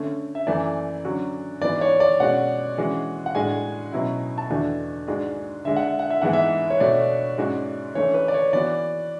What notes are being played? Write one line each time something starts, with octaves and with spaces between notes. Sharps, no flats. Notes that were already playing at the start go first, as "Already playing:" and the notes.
Already playing: D3 A3 C#4
E5
F#2 E3 A3 D5
D3 F#3 C#4 F#4
G#2 E3 B3 F#4 D5
C#5
D5
B2 G#3 C#4 F#4 F#5
E3 G#3 C#4 F#4
F#5
A2 G#3 D4 F#4 G#5
B2 F#3 C#4 E4
A5
E2 D3 A3 D4 F#4 G#5
G#2 G#3 D4 F#4
D3 G#3 D4 E5
F#5
E5
F#5
E5
G#2 E3 G#3 B3 E4 F#5
E5
C#5
B2 A3 D4 F#4 D5
G#2 G#3 C#4 F#4
E3 A3 C#4 C#5
B4
D5
C#5
E3 B3 F#4 D5